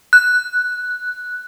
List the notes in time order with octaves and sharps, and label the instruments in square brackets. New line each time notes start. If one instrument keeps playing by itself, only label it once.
[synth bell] F#6